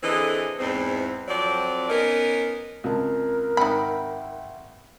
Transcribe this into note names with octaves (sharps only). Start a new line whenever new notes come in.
D3 E3 C4 G#4 A4 D#5
E2 G#2 C4
F2 F3 F#3 C4 D5
B3 C#4 D#4 A#4
C#2 C4 A#4 A5
G#1 D#4 E5 F#5 G5 B5